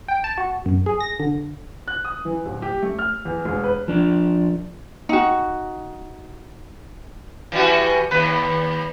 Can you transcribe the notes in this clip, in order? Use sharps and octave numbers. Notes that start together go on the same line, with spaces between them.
G5
A5
F#4
F#2
G#4
A#6
D3
F#6
D#6
E3
D1
G4
A3
F6
E2
E1
B4
F3 D4
D#4 F#4
E3 G3 F#4
D#2 B4